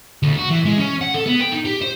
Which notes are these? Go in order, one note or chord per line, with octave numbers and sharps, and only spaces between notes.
D2
F#4
E3
G#3
C#4
F#5
A4
B3
G5
D#4
G4
C5